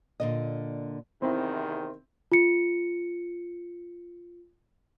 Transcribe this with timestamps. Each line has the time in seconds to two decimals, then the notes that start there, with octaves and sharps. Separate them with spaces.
0.20 A#2 D3 D#5
1.22 E2 C3 D#3 C4 E4
2.32 F4 C#7